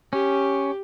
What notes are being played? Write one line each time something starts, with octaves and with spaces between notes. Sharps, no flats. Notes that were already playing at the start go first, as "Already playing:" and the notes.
C#4 G4